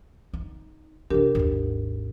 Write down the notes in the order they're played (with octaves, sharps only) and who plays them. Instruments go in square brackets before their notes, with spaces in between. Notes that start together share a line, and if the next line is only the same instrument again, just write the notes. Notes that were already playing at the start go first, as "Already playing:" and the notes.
[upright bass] D#4
[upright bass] C3 C#4 [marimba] D4 G4 A#4
[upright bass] G#1 D#2